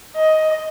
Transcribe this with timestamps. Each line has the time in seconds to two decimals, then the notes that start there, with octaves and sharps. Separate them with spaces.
0.16 D#5